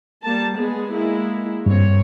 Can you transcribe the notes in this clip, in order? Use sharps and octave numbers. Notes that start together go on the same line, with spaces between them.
G3 A#3 A5
G#3 B3 G#4
G#3 A#3 E4
G2 A#3 C4 C#5